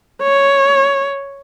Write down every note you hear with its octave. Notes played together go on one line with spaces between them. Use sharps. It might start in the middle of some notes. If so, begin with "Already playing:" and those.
C#5